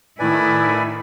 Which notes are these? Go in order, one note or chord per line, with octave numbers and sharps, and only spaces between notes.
A2 D#3 A3 E4 B4 D5 G#5